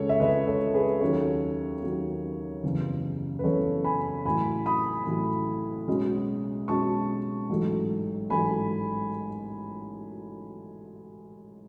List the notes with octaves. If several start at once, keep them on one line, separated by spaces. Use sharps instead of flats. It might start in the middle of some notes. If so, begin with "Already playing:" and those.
Already playing: C#2 C#3 G#3 G#4 A4 C#5
E5
C#2 C#3 G#3 B4 D#5
A4 C#5
G#4 B4
D#2 D#3 F#3 C#4 A4 C#5
D#2 D#3 F#3 C#4
F#1 E2 C#3
B4
F#1 E2 C#3 A4 C#5
G#5 B5
A1 A2 F#3 G#5 B5
B5 D#6
A1 A2 F#3
B1 B2 G#3 C#4
B1 B2 G#3 C#4 A5 C#6
A1 G#2 F#3 A3
A1 G#2 F#3 A3 G#5 B5